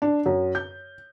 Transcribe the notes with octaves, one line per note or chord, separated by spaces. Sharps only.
D4
F#2
G6